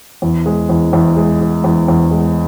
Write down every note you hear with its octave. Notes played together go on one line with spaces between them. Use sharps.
E2
G#3
E2
E2
G#3
G#3
E2
E2
G#3